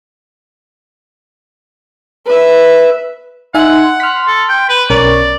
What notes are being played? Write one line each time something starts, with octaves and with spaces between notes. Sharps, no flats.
B4 E5
D#4 E5 F#5 G#5 C6
C6 F6 B6
A4
G5
B4
B1 C#4 A#4 D5 C#6